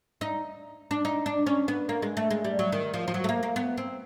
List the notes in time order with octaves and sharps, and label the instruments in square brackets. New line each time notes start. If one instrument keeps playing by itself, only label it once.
[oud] D#4
D4
D#4
D4
C#4
B3
A#3
G#3
A3
G#3
G3
F#3
D#3
F3
F3
F#3
A3
A#3
A#3
B3
C4